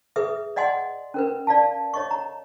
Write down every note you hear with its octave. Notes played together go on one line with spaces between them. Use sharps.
G#4 B4 E5 D#6
D5 D#5 F#5 G#5 C6
C#4 A#4 B4
D5 F5 A5
C#5 D#5 C#6
A#5